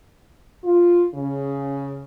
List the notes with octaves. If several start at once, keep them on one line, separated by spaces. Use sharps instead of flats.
F4
C#3